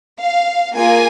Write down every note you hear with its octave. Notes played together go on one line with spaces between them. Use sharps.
F5
A#3 F4 G#4 G#5